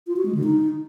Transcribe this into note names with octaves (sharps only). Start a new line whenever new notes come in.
F4
F#4
G#3
D3
D#4